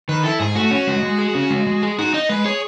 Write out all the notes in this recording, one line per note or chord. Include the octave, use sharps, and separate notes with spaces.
D#3 B4
E4 A4
G#2 G#4
A3 F#4
C#4
G#3
G#3
G#4
C#4
G#3
G#3
G#4
D#4 F#4
D#4 D#5
G#3 B4
G#4 C#5